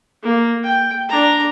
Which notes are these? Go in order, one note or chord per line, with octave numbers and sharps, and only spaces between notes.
A#3
G5
D4 A#5